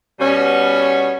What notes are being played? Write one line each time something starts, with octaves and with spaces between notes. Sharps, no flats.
B2 G3 B3 C#4